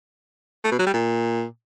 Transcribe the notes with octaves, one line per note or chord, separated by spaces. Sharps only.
A3
B2
F#3
G3
A#2